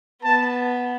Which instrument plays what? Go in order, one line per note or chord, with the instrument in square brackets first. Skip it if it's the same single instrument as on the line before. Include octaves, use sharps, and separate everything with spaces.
[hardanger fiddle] B3 [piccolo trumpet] A5